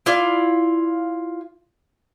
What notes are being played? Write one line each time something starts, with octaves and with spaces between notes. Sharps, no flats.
E4 F4 D5